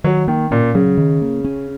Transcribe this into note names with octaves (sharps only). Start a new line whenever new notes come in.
D#3 F#3
D#3 A#3
A#2 C#4
C#3 F#3
D#3
A#3
C#4